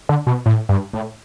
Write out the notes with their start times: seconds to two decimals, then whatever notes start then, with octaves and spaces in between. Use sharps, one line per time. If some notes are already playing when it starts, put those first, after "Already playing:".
0.09 D3
0.27 B2
0.46 A2
0.69 G2
0.93 A2